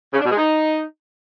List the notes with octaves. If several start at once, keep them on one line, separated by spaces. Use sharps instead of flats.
C#3
D4
B2
G#3
D#4